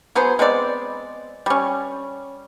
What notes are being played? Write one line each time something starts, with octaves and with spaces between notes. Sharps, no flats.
F#3 B3 G#4 C5
G#3 B3 C4 D5
G3 C#4